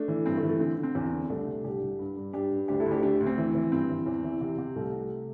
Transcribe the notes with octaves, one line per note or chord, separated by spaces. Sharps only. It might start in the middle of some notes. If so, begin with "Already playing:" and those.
Already playing: A3 D4
E3
G2 C4
A3
E3
A3
D3 C4
D3
C4
E2 C4
D3
C4
C2 A3 D4
C3
C2 D4 G4
C2
G2
G2
G2 D4 G4
G2
D2 D4 G4
E4 A4
D2
D4 G4
A4
D3 D4 G4
D2
C4
E3
E3
G2 C4
E3
E2
E3
C3
C3
C2 A3
C3